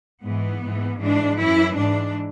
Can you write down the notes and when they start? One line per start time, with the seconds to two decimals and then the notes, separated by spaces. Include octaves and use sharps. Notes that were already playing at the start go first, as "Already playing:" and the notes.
0.23 G#2 E3 B3
0.62 G#2 E3
1.00 G#2 E3 D4
1.39 F#2 E3 E4
1.77 G#2 E3 D4